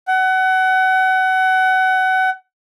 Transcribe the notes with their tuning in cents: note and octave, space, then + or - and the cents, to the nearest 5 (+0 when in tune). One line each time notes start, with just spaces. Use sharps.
F#5 +25